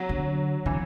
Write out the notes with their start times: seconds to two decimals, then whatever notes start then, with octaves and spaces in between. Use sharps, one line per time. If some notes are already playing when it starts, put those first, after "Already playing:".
Already playing: F#3
0.09 D3
0.66 D3 E3